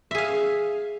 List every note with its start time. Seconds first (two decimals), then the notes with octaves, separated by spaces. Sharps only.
0.11 E5
0.15 G#4
0.18 F5